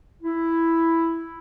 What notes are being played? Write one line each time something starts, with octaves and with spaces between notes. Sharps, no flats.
E4